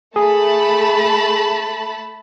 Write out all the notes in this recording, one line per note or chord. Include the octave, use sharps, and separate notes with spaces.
A3 G#4 A5 B5